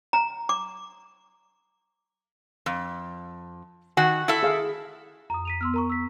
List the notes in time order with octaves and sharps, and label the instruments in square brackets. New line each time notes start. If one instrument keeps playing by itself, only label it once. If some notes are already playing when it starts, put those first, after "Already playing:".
[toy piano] A#5
D6
[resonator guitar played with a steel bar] F2
[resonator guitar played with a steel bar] D#3 F#4 [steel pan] F#5 G#5
[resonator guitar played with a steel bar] E4 A4 E5
[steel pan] G#4 F5
[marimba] F2 [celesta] A#5 D#6
[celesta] B6 D#7 F7
[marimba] B3 [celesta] C6 E6 F6
[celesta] A#4 A#5 C#6
[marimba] C#6 [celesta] E6 B6